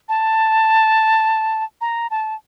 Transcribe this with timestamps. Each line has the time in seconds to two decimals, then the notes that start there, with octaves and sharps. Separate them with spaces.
0.09 A5
1.81 A#5
2.11 A5